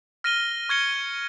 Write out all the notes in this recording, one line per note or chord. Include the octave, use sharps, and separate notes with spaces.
F6 A#6 D#7 G7
C#6 F6 G#6 C#7 G7